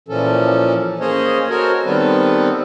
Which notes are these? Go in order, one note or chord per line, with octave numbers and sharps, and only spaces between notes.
A#2 E3 F3 C#4 A4
A#3 C#4 G#4 C5 C#5 D#5
F#4 A4 A#4 C5 C#5
D#3 G3 B3 C4 A4 B4